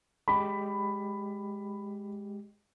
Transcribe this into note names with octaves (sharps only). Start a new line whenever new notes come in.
G#3 G4 B5